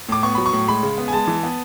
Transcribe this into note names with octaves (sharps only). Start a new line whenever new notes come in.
A2 D6
B3 C#6
F#3 B5
C#6
A2
G#3 B5
C#3
B3
G#5
G#3 A5
E3
B3